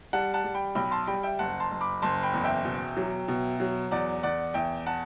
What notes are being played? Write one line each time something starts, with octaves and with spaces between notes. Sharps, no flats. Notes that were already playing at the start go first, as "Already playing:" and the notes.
G3 F#5 A5
F#5 A5
G3
G5 B5
B1 G5 B5
A5 C6
G3 G5 B5
E5 G5
F#1 F#5 A5
A5 C6
F#1
B5 D6
F#1 A5 C6
G5 B5
E2
E5 G5
B2
F#3
B2
F#3
E2 D5 F#5
E2 D5 F#5
E2 E5 G5
F#5 A5